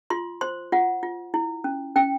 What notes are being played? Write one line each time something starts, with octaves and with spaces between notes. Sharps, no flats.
F4 C6
C5 C6
F4 F#5
F4
E4
C#4
C#4 G5